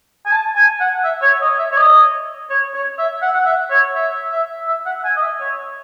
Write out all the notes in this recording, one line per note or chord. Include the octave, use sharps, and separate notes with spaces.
G#5
A5
G#5
F#5
E5
C#5
D#5
E5
C#5
D#5
C#5
C#5
E5
F#5
F#5
E5
C#5
E5
E5
E5
F#5
G#5
D#5
E5
C#5